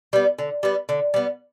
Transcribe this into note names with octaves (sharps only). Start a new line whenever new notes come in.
G3 B3
D3
G3 B3
D3
G3 B3